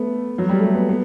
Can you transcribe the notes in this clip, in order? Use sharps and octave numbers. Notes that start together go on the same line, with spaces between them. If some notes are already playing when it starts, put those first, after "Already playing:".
Already playing: A3 B3
F#3
G3
A3
B3
B3